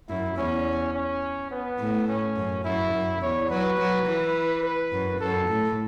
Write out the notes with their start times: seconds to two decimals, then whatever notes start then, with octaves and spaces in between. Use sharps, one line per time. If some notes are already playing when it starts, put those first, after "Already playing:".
0.09 F#2 E4
0.37 E2 C#4
0.94 C#4
1.51 B3
1.79 A2
2.08 C#4
2.37 F#2
2.64 F#2 E4
2.94 F#2
3.21 E2 C#5
3.50 F#3 B4
3.79 F#3
4.06 E3
4.64 B4
4.93 F#2
5.20 F#2 A4
5.49 A2